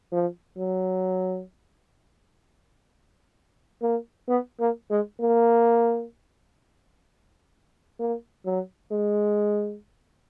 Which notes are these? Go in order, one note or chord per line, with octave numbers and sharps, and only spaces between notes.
F3
F#3
A#3
B3
A#3
G#3
A#3
A#3
F#3
G#3